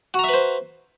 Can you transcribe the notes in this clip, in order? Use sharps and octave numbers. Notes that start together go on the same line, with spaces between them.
F#4 B4 C5 E5 A#5